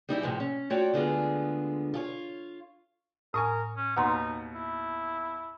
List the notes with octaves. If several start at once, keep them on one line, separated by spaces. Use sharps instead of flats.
G3 D#4 E4 G4
A2 C3 F3 G#3
C#4
A3 F4 F#4 C#5 D5 G5
D2 D3 G#3 B3 F4 G#4
F4 G#4 C#5
A2 A#4 G#5 C#6 D#6
C#4
D#2 B2 B3 D#4 F#5 A#5 C6
E4